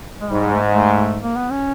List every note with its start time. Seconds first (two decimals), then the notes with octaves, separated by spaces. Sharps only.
0.21 G#3
0.31 G#2 G3
0.54 A3
0.63 G#3
0.73 A3
1.22 A#3
1.36 B3
1.51 C#4